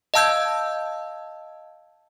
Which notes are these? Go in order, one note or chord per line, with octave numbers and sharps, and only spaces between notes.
D#5 F5 A5 E6 G6 G#6